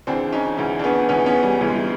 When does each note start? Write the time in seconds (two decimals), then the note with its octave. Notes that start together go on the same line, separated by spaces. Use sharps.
0.07 D2 C#3 E3 C4 D4
0.33 C#4 D#4
0.58 D2 C#3 E3
0.79 D4
0.84 B3 C#4
1.09 D2 C#3 E3 B3 C#4
1.26 B3 C#4
1.43 G3
1.60 D2 C#3 E3 G3
1.67 G#3
1.76 G3